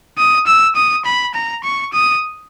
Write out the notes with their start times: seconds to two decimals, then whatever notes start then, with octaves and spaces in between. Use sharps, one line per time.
0.18 D#6
0.47 E6
0.76 D#6
1.05 B5
1.34 A#5
1.64 C#6
1.93 D#6